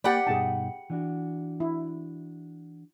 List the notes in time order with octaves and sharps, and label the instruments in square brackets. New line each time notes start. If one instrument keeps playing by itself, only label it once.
[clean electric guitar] A#3 [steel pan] G4 D5 [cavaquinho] F#5 G5 B5
[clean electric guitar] G2 B2 D#4 [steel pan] G#4 A5
[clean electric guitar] E3 D4 F#4
[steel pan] E4